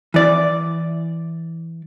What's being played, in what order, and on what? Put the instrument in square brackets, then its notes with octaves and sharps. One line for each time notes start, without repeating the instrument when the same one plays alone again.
[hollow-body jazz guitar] E3 D5